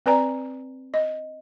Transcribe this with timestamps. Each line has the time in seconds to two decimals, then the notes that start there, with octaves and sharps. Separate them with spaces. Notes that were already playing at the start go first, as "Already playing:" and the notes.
0.06 C4 B4 D5 G#5 A#5
0.94 D#5